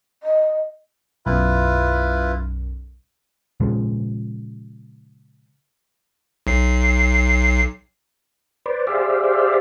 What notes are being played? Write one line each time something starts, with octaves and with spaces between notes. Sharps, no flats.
D#5
B1 F#2 E4 F4 B4
A#2 C#3 F3 G#3
B1 C7
B4 C5 D5
G4 G#4 C5 D5 E5 F5